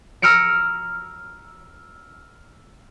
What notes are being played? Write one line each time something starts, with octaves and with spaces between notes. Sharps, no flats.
A#5 E6 F6 C#7 D7